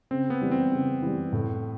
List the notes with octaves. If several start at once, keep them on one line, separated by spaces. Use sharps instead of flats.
C#3 C4
B3
E3 G3
C4
C#3
E3 G3
A2